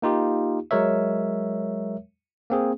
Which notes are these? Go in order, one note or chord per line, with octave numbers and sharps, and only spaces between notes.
A#3 D#4 F4 G4
F#3 G#3 A#4 C#5 E5
A#3 C4 G#4